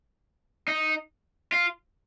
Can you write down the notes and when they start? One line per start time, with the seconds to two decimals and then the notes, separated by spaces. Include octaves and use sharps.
0.68 D#4
1.52 F4